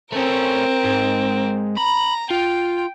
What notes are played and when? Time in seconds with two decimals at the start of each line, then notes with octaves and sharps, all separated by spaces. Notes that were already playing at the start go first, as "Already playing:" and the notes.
0.12 A3 C4 C#4 A#4
0.84 G#2
1.77 A#5 B5
2.30 F4 G5